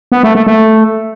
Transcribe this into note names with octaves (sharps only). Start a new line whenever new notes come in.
B3
A3
A3
A3